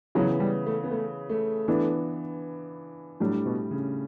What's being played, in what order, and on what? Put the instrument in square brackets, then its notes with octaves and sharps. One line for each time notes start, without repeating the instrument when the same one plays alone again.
[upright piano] C#3 E3 B3 [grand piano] F#3
[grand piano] G3
A3
B3
A3
A3
[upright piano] E3 B3 D4
[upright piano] A2 G3 D4 [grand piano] F#3
[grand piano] B2
C#3